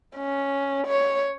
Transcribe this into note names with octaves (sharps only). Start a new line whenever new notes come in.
C#4
C#5